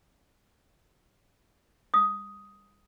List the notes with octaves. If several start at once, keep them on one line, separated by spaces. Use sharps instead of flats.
D#6